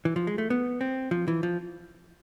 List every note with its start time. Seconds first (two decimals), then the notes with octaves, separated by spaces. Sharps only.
0.05 E3
0.16 F3
0.27 G#3
0.38 A3
0.50 B3
0.81 C4
1.11 F3
1.28 E3
1.43 F3